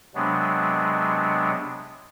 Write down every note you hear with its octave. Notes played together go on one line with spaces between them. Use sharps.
C3 F#3 G#3 B3 D4